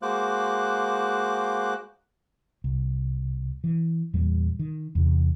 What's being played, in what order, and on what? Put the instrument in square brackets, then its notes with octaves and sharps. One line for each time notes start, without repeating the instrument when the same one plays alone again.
[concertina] G#3 A#3 F#4 C5 D6 F#6
[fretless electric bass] C2
E3
E2 A#2 G3
D#3
E2 C3